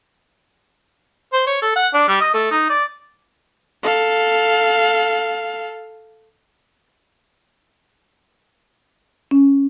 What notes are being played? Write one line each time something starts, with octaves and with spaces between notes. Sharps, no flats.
C5
C#5
A4
F#5
D4
G3
D#5
A3
D#4
D5
A4 F5
C#4